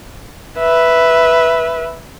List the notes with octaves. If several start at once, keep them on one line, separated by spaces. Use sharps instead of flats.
B4 E5